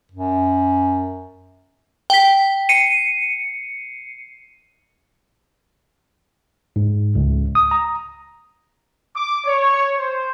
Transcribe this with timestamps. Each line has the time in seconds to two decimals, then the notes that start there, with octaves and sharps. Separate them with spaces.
0.12 F#2
2.10 G5 B6
2.69 C7 C#7 D#7
6.76 G#2
7.15 C#2
7.55 D#6
7.71 A#5
9.15 D6
9.46 C#5
9.98 C5